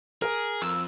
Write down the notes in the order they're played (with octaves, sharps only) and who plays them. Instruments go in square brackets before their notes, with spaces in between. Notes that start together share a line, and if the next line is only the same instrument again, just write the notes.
[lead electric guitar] G#4 [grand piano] A#4
[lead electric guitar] F2 [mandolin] E6